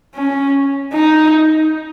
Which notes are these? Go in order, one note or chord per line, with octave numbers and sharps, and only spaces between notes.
C#4
D#4